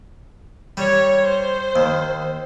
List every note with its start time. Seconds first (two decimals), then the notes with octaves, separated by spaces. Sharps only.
0.77 G3 C#5
1.23 C5
1.76 D#2